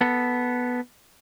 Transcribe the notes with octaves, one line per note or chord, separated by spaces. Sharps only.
B3 A4